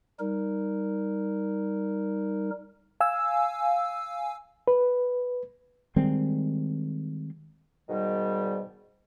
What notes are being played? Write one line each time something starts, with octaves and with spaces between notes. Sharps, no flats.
G3 D#4 A#4
F5 G#5 E6
B4
D#3 G3 G#3 C4
G#2 B2 D#3 G3